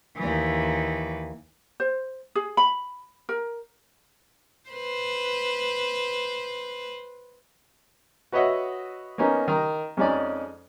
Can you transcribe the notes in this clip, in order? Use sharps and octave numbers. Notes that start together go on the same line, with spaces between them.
D#2 E3
C5
G#4
B5
A#4
B4 C5
F#4 B4 C#5 D#5 E5 F#5
A#3 B3 C#4 D#4
D#3 A#5
F2 G#3 C#4 D#4 D5